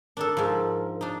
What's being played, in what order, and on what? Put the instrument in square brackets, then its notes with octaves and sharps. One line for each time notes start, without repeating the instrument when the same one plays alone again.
[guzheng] D4 D#4 A4 [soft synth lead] A#4
[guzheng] G#2 F3
D4 D#4